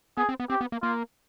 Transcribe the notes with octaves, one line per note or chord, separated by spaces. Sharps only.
B3 G#4
C4
B3
C4 G4
B3
A#3
A#3 F4